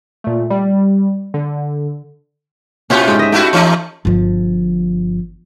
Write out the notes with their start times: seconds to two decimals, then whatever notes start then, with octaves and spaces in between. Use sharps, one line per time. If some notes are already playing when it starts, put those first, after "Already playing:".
0.24 A#2 A3
0.50 G3
1.34 D3
2.90 A#2 C#4 E4 F4 G4
3.07 G#2 G4
3.19 D#5 E5
3.32 A3 E4 F#4 G4
3.53 E3 A3 D#4
4.05 G1 F3